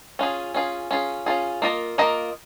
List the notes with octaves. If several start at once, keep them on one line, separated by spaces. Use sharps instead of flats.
C#4 F4 G#4
C#4 F4 G#4
C#4 F4 G#4
C#4 F4 G#4
A#3 F4 A#4 D#5
A#3 F4 A#4 D#5